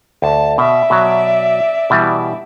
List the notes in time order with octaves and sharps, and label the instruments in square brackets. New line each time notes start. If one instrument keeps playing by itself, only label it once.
[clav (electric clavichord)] D2 [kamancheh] A5
[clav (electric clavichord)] B2 [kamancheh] D5 E5
[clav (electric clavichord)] B2 F#3
B2 E3 G3